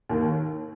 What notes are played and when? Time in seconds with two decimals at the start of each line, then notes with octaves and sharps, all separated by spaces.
0.10 D#2 D#3